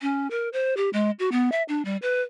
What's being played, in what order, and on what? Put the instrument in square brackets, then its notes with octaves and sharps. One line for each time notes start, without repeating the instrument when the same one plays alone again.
[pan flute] C#4
A#4
C5
G4
G#3
F#4
B3
E5
D4
G3
B4